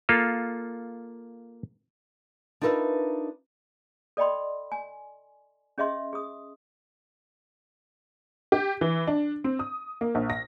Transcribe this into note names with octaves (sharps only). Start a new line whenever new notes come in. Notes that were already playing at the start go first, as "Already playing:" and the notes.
A#3 F4 A4
D4 D#4 F4 A#4 B4 E5
A4 D5 D#5 G5 B5 C6
G#5
C#4 G#4 D#5 E5 C6
G#4 D#6
G4
E3
D4
C4
D#6
A#3
A#1
A#6